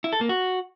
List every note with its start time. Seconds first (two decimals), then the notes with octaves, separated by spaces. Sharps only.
0.04 E4
0.13 A4
0.21 A#3
0.29 F#4